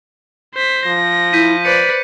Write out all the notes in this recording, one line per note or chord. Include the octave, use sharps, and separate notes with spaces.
C5 B6
F3 A#6
E4 G6 B6 D#7
B4 C5 D5 C#7